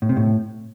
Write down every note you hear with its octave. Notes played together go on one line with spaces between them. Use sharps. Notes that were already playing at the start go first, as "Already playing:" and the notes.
A2
C3
A2